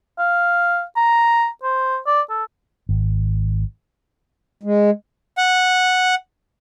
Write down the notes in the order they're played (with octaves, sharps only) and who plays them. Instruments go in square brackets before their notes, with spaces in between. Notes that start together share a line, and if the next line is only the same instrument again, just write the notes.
[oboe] F5
A#5
C5
D5
A4
[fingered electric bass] G#1
[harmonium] G#3
[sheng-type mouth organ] F#5